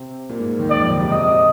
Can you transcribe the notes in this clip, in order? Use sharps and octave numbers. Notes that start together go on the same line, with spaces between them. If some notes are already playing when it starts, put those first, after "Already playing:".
Already playing: C3 C4
A#2 A#3
G#2 G#3
D#2 D#3
D#2 D#3 D5
F2 F3
D#2 D#3
C3
C3 D#5